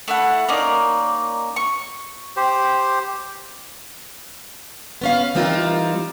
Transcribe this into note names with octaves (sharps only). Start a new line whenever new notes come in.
A3 E4 F#5
A#3 C#4 D#4 D5
C#6
G4 C5
B3 C#4 F5
E3 G3 C4 D#4 F4 A#4